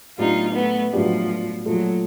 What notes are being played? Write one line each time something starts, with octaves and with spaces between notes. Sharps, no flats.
A2 F#3 B3 D4 D#4 F4 G4
A3 B3
A2 F3 F#3 B3 D4 G4
A#2 F3 F#3 A3